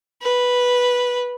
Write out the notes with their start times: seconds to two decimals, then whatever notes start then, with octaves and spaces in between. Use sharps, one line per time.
0.22 B4